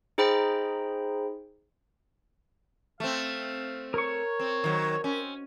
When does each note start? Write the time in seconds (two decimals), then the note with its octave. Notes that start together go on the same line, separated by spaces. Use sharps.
0.18 D#4 G#4 C5 G5 A#5 B5
3.00 A3 C4 F5
3.94 A#4 C#5 C#6
4.39 C4
4.64 D#3 F#3
5.04 C4 C#4